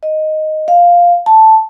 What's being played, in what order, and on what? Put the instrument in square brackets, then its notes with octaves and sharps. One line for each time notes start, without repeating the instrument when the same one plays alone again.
[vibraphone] D#5
F5
A5